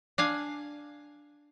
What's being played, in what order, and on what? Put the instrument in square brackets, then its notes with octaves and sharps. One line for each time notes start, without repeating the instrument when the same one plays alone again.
[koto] D4 F5 G#5